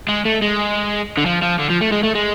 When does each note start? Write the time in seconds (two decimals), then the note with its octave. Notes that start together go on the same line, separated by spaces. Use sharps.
0.09 G#3
0.25 A3
0.42 G#3
1.17 D3
1.26 F3
1.43 F3
1.59 D3
1.70 F3
1.81 A3
1.92 G#3
2.04 A3
2.15 G#3